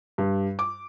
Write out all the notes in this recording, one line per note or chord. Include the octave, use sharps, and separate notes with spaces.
G2
D6